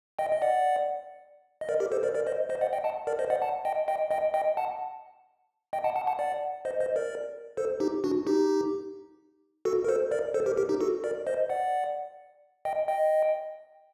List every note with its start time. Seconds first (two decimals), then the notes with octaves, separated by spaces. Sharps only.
0.19 D#5 G5
0.32 D#5
0.42 D5 F#5
1.61 D#5
1.69 A#4 D5
1.80 G4 A#4
1.92 A4 C5
2.03 A#4 D5
2.15 A#4 D5
2.27 C5 D#5
2.49 C5 D#5
2.61 D5 F#5
2.73 D#5 G5
2.84 F#5 A5
3.07 A#4 D5
3.19 C5 D#5
3.30 D5 F#5
3.42 F#5 A5
3.65 D#5 G5
3.88 D#5 G5
4.11 D#5 G5
4.34 D#5 G5
4.57 F#5 A5
5.73 D#5 G5
5.84 F#5 A5
5.96 F#5 A5
6.07 F#5 A5
6.19 D5 F#5
6.65 C5 D#5
6.80 C5 D#5
6.96 A#4 D5
7.57 A4 C5
7.80 D#4 G4
8.04 D4 F#4
8.27 D#4 G4
9.65 F#4 A4
9.84 A#4
9.88 A4 C5
10.11 A#4 D5
10.34 A4 C5
10.46 G4 A#4
10.57 G4 A#4
10.69 D#4 G4
10.81 F#4 A4
11.04 A#4 D5
11.27 C5 D#5
11.50 D5 F#5
12.65 D#5 G5
12.88 D#5 G5